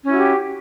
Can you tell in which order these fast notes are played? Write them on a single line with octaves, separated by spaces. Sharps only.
C#4 E4 F#4 G4